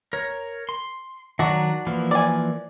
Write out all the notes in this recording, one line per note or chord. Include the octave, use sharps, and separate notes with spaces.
A#4 C#5
C6
D#3 F#3 D4 F#4
E3 F3 A#3
D5 G#5